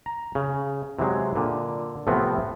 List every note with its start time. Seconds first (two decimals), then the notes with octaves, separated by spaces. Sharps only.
0.06 A#5
0.35 C#3
0.99 C3 E3 F#3 G#3
1.36 A#2 D3
2.07 A2 C3 E3 F3 B3 C4